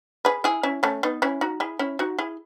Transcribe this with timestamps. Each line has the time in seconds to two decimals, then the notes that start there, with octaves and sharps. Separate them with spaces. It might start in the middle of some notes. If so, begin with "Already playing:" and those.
0.25 G#4 B4
0.44 E4 G#4
0.63 C#4 E4
0.83 A3 C#4
1.03 B3 D#4
1.22 C#4 E4
1.41 D#4 F#4
1.60 E4 G#4
1.79 C#4 E4
1.99 D#4 F#4
2.18 E4 G#4